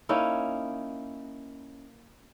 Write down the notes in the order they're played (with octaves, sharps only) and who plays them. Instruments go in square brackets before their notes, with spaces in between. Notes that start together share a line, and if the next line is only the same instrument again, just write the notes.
[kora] A#3 C#4 D#4 E4